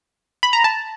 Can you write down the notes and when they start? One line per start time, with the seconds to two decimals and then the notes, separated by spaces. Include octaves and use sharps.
0.43 B5
0.53 A#5
0.64 A5